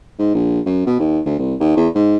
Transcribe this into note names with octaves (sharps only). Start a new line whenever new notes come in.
G#2
A#1
F#2
B2
D#2
D2
C2
D#2
E2
G#2